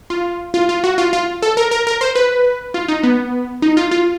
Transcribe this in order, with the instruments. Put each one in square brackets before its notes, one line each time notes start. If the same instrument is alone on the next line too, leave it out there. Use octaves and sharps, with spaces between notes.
[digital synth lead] F4
F4
F4
F#4
F4
F4
A4
A#4
A#4
A#4
C5
B4
F4
D#4
B3
D#4
F4
F4